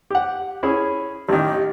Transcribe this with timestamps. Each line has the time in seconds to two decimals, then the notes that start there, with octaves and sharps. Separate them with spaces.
0.10 G4 F#5
0.63 C#4 E4 G#4
1.29 A1 D#3 G4